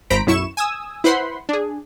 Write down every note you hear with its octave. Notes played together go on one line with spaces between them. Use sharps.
G#1 C5 A#5 B5 B6 D7
B1 F#2 E4 C#6 E7
G#5 D#6 E6
E4 B4 C5 F#5 B5 C6
D4 G#4